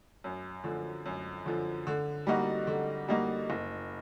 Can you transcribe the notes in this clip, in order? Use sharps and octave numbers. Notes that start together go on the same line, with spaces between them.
F#2
D3 F3
F#2
D3 F3
D3
G3 A#3 D#4 F#4
D3
G3 A#3 D#4 F#4
F#1